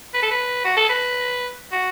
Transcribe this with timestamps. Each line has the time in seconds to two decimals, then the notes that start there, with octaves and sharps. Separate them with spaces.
0.14 B4
0.23 A4
0.31 B4
0.65 F#4
0.77 A4
0.89 B4
1.72 F#4